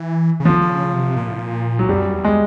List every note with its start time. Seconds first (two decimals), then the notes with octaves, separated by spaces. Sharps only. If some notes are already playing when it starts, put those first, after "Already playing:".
Already playing: E3
0.40 C#3
0.45 D3 F3
0.61 D3
0.70 C#3
0.93 C3
1.16 A#2
1.27 A2
1.39 A#2
1.79 F#3
1.89 F#2 G3
2.13 E2
2.24 G#3